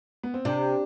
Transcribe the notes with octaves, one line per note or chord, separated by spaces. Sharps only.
B3
C4
C3 D4